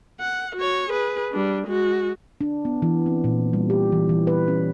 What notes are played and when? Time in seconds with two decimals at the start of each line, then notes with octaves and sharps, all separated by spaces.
0.20 F#5
0.56 F#4 C#5
0.89 G#4 B4
1.32 G3 D4
1.67 G#3 F#4
2.41 D4
2.65 B3
2.82 E3
3.06 C4
3.24 A#2
3.53 G3
3.70 G4
3.92 E3
4.09 E3
4.27 B4
4.48 C#4